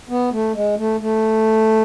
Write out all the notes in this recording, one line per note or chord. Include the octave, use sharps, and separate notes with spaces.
B3
A3
G#3
A3
A3